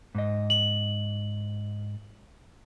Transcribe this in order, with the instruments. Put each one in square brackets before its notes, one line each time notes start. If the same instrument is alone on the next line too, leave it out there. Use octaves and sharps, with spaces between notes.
[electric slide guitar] G#2 D#5
[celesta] F#7